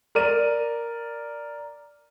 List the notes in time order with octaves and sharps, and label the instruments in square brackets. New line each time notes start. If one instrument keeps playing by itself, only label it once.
[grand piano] A#4 D5 D#7